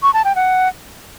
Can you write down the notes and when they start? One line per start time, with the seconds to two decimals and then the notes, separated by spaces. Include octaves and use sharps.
0.03 C#6
0.14 A5
0.25 G5
0.36 F#5